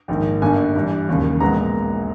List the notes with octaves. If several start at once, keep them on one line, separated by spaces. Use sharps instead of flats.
A#1 G#2 D#3 G5
G1 G2 G3 A#3 G#5
G2 E3 G3
E1 D#2 C#3
A#1 A#2 G#3 B3 A#5